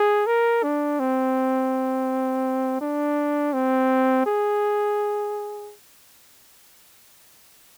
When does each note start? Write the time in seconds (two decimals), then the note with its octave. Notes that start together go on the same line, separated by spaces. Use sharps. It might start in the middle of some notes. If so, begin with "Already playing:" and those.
Already playing: G#4
0.27 A#4
0.63 D4
0.99 C4
2.81 D4
3.53 C4
4.26 G#4